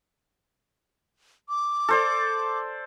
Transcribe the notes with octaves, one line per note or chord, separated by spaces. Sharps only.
D6
A4 C5 D5